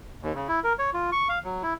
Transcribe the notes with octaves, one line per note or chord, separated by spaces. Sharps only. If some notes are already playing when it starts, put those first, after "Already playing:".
D#2
C#3
E4
A#4
C#5
F4
C#6
F5
F#3
E4